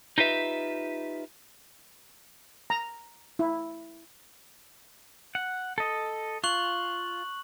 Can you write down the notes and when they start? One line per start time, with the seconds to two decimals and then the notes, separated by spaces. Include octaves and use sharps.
0.18 D#4 F4 G4 B4 E5
2.70 A#5
3.39 E4
5.35 F#5
5.78 A4 D#5
6.44 F4 C#6 F#6 F#7